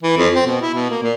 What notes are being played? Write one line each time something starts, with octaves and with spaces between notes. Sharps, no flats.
E3
F2
C4
B2
E4
B2
A#3
A#2